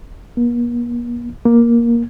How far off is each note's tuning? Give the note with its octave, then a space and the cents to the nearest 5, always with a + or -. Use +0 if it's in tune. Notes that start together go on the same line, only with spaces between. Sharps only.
A#3 +45
A#3 +10